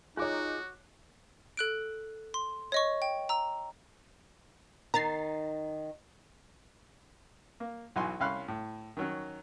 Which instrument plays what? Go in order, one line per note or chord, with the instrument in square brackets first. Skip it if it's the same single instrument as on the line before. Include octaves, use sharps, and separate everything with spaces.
[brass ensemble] D#4 [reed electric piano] F4 G#4 G#5 [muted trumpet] F#4 [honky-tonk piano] C#5 D6 F#6
[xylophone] A4 F#6 D7
C6
C#5 D#5 C#6
G5
A#5 E6
[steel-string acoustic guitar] D#3 [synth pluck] A#5 A6 C7
[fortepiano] A#3
B1 E3 F#4 G#5 C6
C2 C#4 F5 B5 C6 F#6
A2
D#3 F#3 C#4